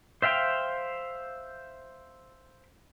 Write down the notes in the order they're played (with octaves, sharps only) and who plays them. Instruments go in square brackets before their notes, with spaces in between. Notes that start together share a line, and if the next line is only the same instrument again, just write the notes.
[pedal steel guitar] C5 E5 F5 G5